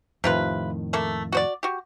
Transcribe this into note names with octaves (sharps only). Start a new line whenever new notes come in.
F2 A2 C3 D#3 F4 B4
A3 A#3 A4
F#4 C5 D5
F#4 G4